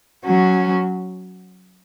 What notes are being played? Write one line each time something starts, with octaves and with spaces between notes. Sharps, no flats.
F#3 C#4 F#4